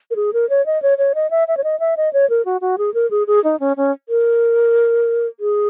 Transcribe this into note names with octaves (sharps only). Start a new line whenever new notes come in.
A#4
G#4
A#4
C#5
D#5
C#5
C#5
D#5
E5
E5
C#5
D#5
E5
D#5
C#5
A#4
F#4
F#4
G#4
A#4
G#4
G#4
D#4
C#4
C#4
A#4
G#4